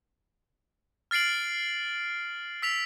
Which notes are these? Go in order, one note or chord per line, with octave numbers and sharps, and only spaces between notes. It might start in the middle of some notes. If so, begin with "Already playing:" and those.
F6 A6 C7 D7 F#7
E6 B6 F7